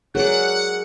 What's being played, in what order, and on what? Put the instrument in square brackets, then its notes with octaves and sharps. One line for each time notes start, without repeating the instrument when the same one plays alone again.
[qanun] F#3 D5 [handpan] G#4 A#4 [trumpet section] F#5